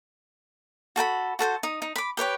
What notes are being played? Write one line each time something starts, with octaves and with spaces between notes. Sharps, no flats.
F#4 A4 G5 B5
F#4 A4 B4 C5
D#4 D#6
D#4
B5 D6
G4 B4 C#5 G5